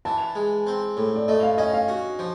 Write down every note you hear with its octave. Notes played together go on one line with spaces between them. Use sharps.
E3 A5
G#3
C4
A2
D5
A3 D#5
F5
C#4 D#5
F5
F#4
F3